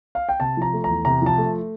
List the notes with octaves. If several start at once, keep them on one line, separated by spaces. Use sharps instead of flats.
F5
G5
C3 A5
F3 A#5
A3
E2 A#5
C3 A#5
F3 A5
A3